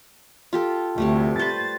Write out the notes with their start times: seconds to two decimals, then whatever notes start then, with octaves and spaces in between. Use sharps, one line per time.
0.53 F4 G4 A4
0.98 D2 C3 G3 A3
1.39 B4 C5 A6